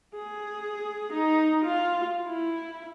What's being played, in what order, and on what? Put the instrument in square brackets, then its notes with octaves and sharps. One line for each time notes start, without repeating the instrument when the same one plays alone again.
[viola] G#4
D#4
F4
E4